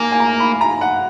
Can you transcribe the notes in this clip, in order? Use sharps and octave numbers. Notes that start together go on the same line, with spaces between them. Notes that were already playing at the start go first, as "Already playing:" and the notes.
Already playing: A#3 G#5
G#5
A#5
B5
A#5
F#5